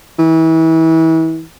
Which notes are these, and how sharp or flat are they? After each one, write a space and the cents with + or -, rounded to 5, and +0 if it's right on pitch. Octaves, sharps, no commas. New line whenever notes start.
E3 -30